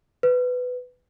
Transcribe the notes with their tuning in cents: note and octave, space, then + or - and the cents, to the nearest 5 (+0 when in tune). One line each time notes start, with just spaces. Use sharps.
B4 +15